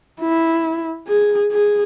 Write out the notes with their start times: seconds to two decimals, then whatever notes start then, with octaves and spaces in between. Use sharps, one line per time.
0.20 E4
1.08 G#4
1.52 G#4